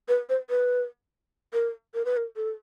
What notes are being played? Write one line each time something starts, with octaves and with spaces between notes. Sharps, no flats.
B4
C5
B4
A#4
A#4
B4
A#4
A4